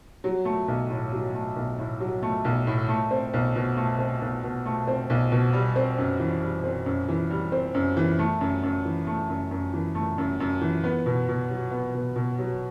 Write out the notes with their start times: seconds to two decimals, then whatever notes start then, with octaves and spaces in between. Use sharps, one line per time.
0.24 F#3
0.45 A3
0.68 B1
0.90 A2
1.12 F#3
1.34 A3
1.56 B1
1.79 A2
2.00 F#3
2.23 A3
2.45 B1
2.67 A2
2.89 A3
3.11 C4
3.34 B1
3.56 B2
3.77 A3
3.99 C4
4.21 B1
4.44 B2
4.66 A3
4.87 C4
5.10 B1
5.32 B2
5.53 G3
5.76 C4
5.98 F#2
6.20 E3
6.42 G3
6.64 C4
6.86 F#2
7.09 E3
7.31 G3
7.52 C4
7.75 F#2
7.97 E3
8.19 A3
8.41 F#2
8.63 F#2
8.85 E3
9.07 A3
9.29 F#2
9.51 F#2
9.74 E3
9.95 A3
10.18 F#2
10.40 F#2
10.61 E3
10.84 B3
11.06 B2
11.28 B2
11.50 F#3
11.71 B3
11.94 B2
12.16 B2
12.39 F#3